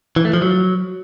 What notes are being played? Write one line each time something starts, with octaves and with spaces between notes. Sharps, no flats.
E3
A3
F3
F#3